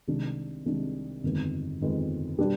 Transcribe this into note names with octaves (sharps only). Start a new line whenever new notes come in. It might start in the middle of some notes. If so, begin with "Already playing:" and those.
C2 C3 D#3 G#3 D4
C2 C3 D#3 G#3 D4
G1 F2 D#3 G#3 B3
G1 F2 D#3 G#3 B3
B2 G3 B3 D4